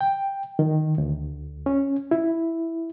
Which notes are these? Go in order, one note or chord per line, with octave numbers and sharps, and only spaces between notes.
G5
D#3
D2
C#4
E4